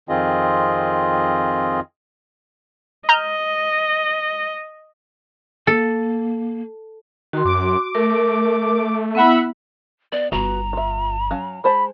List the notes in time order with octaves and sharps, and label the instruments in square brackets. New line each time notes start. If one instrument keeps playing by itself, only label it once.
[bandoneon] F2 D#3 C4 F4 G#4 D#5
[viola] D#5 [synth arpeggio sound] A#5 F6 G6
[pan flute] A#3 [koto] A4
[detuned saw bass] D#3 [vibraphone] F#4 C6
[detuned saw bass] F#2 [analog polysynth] D6
[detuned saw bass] A3 [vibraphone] A#4
[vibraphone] B3 E4 [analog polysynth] E5 F#5 B5
[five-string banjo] B3 [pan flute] D5
[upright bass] G1 [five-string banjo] B3 F#4 B4 [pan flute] A#5
[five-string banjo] F4 E5
F#3 C#4 F5
[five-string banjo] G#3 C5 A5 [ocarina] B5